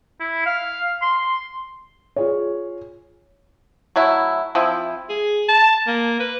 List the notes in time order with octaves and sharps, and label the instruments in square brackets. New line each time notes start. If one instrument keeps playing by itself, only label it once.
[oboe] E4
F5
C6
[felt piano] F4 G#4 C#5
[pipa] F#3 A3 E4
F3 C4 E4
[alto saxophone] G#4
A5
A#3
B4